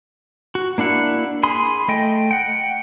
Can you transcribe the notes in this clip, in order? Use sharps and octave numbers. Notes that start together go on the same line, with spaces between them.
F#4
A#3 D4 E4 F#5
G#4 B5 C6 D#6
A3 D#5 G5
F#5 G5